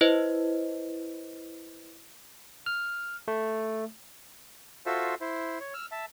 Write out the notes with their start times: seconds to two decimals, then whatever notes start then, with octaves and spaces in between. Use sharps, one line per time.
0.01 E4 B4 C5 D#5
2.66 F6
3.28 A3
4.86 F4 F#4 A4 C5 E5
5.21 E4 C5
5.60 C#5
5.74 E6 F6
5.92 E5 A5